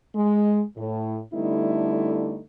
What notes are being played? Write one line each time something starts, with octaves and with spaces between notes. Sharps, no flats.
G#3
A2
D3 G3 A3 B3 D#4 E4